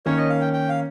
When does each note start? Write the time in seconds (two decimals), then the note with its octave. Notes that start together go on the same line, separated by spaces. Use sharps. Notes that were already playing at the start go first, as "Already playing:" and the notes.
0.06 D#3 A#3 C#4 C#5
0.17 D#5
0.29 F5
0.41 G5
0.53 G5
0.69 F5